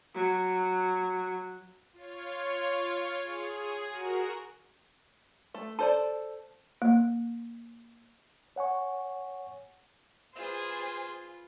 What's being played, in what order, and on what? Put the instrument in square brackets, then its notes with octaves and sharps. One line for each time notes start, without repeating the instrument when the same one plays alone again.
[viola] F#3
[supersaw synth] F4 C#5
G#4
F#4 A#4
[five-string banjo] A3
[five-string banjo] A4 C5 D5 [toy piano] A5
[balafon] A#3
[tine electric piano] C#5 F#5 G#5 C#6
[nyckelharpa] F4 B4 [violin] G#4 C5